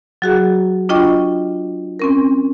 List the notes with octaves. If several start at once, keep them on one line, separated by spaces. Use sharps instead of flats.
F#3 F#4 G#4
D4 F4 D#5 G5 C#6
C4 C#4 A#4